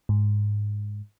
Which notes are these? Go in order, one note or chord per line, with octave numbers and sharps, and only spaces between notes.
G#2